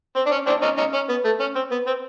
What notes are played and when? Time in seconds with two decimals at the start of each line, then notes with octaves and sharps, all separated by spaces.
0.16 C4
0.26 D4
0.31 C#4
0.47 C4 D4
0.62 C#4 D#4
0.78 C#4 D#4
0.94 C#4
1.09 B3
1.25 A3
1.40 C#4
1.56 C4
1.71 B3
1.87 C4